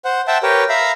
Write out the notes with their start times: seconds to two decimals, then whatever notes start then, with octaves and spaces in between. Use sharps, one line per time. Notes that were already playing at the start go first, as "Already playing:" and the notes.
0.05 C5 F#5
0.27 C5 E5 F#5 G5 A5
0.43 G4 A#4 B4 C#5 G5
0.69 E5 F5 A#5 B5